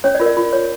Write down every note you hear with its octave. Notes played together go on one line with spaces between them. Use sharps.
C#4 C#5
D5
F4 A#4
D5
F4
C#5